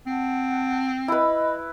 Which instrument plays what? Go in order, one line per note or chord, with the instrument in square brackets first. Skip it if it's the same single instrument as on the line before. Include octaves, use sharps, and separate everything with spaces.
[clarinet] C4 [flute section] F#5 A5
[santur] E4 B4 [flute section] D#5 B5 E6